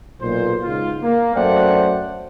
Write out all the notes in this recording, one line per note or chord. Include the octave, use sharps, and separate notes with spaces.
B1 A#2 C5
C#2 G#2 F4
A#3
F#2 A3 C5 D5 F#5 G5